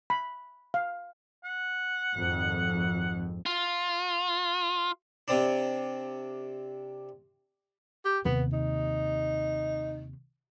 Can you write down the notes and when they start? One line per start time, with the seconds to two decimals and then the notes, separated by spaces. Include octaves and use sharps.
0.10 B5
0.74 F5
1.44 F#5
2.15 G#1 F2
3.46 F4
5.28 C3 C4 D4
8.05 G4
8.25 D#2 C3 B3
8.53 D#4